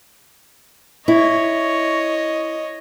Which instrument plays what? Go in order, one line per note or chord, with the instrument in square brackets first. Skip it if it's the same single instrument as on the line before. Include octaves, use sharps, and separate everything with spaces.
[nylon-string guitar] E4 [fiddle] C#5 D#5